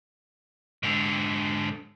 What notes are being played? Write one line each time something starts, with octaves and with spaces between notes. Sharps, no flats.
G#2 D3